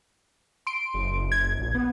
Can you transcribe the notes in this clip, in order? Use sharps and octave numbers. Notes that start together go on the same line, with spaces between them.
C6 D7
F#1
G#6
A#1
B3